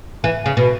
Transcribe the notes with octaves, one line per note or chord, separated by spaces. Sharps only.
E3
C#3
B2